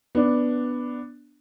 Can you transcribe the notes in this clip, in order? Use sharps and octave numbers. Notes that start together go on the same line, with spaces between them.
B3 D4